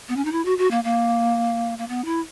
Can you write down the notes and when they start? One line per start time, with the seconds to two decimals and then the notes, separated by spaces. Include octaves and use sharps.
0.09 B3
0.16 C#4
0.25 D#4
0.32 E4
0.45 F#4
0.58 F#4
0.71 A#3
0.84 A#3
1.78 A#3
1.88 B3
2.05 E4